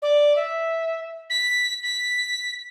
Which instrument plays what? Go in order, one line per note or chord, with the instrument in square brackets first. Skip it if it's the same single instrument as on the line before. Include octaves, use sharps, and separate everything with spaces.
[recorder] D5
E5
B6
B6